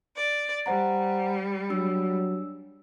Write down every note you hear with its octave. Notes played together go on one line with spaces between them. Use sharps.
D5
G3 C5 F#5 A#5
F#3 D4 E6